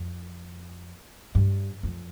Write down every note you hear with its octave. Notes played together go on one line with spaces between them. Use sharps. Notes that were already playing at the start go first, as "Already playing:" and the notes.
Already playing: F2
G2
F2